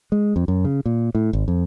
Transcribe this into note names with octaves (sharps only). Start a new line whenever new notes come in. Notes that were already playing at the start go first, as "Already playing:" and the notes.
G#3
F2
F#2
C#3
A#2
A2
G#1
F2